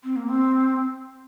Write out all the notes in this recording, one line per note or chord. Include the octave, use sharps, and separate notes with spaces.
C4
A#3
C4